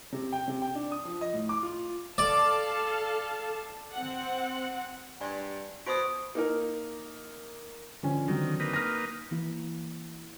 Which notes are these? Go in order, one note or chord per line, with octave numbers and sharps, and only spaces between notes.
C3
G5
C3
G5
D4
D#6
F3
D#5
A2
D6
F4
A4 D5 F5 A5
C4 F#5
G2 D5 G#5
B2 F#4 C5 D#6 D7
A#3 D#4 A#4
D3 F3 C#4
D3 D#3 F#3 C4
A#3 D#4 B4
F6 A#6
E3 A#3 E4